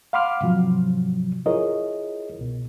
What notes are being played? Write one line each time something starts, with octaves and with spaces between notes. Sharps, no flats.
F5 F#5 B5 C6 D6 F6
G#2 C3 F3 F#3
E4 F4 G#4 A#4 C#5 D#5
C2 B2